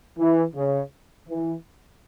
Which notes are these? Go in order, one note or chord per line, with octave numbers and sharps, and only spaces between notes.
E3
C#3
E3